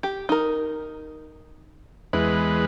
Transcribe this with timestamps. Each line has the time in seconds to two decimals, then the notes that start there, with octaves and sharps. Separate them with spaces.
0.03 G4
0.29 D#4 A#4
2.13 E2 G#3 E4 B4